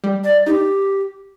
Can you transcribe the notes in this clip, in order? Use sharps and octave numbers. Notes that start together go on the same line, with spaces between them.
G3
D5
D#4 G4